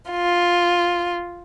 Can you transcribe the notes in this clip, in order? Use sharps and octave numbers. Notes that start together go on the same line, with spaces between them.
F4